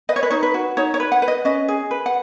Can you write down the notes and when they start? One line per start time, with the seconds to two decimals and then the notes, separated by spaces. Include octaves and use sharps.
0.09 B4 D#5
0.16 C#5
0.23 B4
0.30 D#4 C#5
0.43 B4
0.54 F#4
0.77 D#4 C#5
0.94 C#5
1.00 B4
1.12 F#5
1.22 B4
1.28 D#5
1.45 C#4 D#5
1.68 G#4
1.91 B4
2.06 F#5